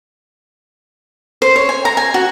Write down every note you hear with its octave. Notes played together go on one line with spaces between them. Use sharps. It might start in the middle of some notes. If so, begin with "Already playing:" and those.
C5
C#5
G#5
A#5
G#5
F#4